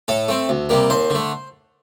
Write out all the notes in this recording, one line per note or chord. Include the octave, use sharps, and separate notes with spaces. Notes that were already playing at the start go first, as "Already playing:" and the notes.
A2 A4
A3 C4
D2
C3 G3 A#3
D#2 C5
D3 A3